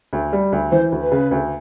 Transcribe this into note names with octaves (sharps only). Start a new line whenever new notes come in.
D2
G3
D2
E3 C5
D2
B4
C#3
D2